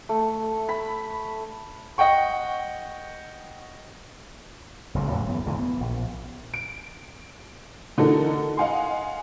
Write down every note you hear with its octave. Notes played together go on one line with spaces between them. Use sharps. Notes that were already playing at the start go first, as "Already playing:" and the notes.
A3
B5
D#5 F#5 G5 C#6
F#1 C#2 F#2 G3
F2 A2 F#3 G3
G#1 F#2 E3 B3
G#1 D2 A#2 E3
B3
A#1
D7
D3 E3 D#4 F#4 A4 A#4
D#5 F5 F#5 G#5 C6